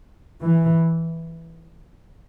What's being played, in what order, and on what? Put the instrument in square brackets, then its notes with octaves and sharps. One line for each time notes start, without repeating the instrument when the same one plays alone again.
[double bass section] E3